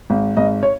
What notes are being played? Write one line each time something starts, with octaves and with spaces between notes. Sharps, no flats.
G#1
G#1 D#5
C#5